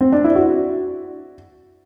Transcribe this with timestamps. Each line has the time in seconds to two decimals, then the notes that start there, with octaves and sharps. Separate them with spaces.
0.01 C4
0.12 D4
0.24 E4
0.35 F#4